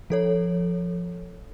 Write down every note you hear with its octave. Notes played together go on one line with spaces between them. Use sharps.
F3 A4 C#5